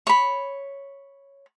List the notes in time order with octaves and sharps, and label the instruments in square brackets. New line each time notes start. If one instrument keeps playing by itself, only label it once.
[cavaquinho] C#5 B5